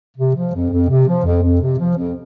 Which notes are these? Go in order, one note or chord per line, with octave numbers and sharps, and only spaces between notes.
C3
F3
F2
F2
C3
F3
F2
F2
C3
F3
F2